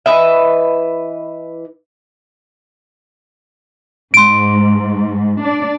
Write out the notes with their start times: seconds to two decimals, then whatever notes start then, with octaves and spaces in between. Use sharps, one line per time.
0.06 E3 B4 D#5 E5
4.14 G#2 C6 D7
5.43 D4 D5